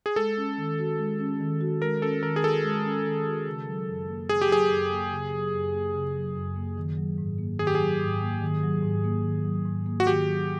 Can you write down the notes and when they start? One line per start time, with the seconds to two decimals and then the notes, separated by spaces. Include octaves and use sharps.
0.06 G#4
0.16 G#3 A4
0.37 C#4
0.58 D#3
0.79 F#4
0.99 G#3
1.20 C#4
1.40 D#3
1.61 F#4
1.82 G#3 A#4
2.02 C#4 A4
2.23 D#3 A#4
2.36 G#4
2.43 F#4 A4
2.64 G#3
2.85 C#4
3.05 D#3
3.26 F#4
3.47 C#3
3.67 F#3
3.88 F#2
4.08 A#3
4.29 C#3 G#4
4.41 G4
4.50 F#3 G#4
4.70 F#2
4.91 A#3
5.12 C#3
5.33 F#3
5.53 F#2
5.73 A#3
5.95 C#3
6.16 F#3
6.35 F#2
6.56 A#3
6.77 D#3
6.97 F#3
7.18 G#2
7.38 A#3
7.59 D#3 G#4
7.67 G4
7.75 F#3 G#4
8.01 G#2
8.22 A#3
8.41 D#3
8.63 F#3
8.83 G#2
9.04 A#3
9.24 D#3
9.45 F#3
9.65 G#2
9.86 A#3
10.00 F#4
10.07 D#3 G4
10.27 F#3